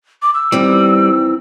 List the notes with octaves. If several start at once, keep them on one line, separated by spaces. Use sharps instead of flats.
D6
E6
D#3 E3 G3 C4